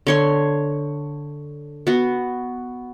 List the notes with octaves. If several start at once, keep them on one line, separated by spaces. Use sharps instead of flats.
D3 C#5 C6
B3 F#4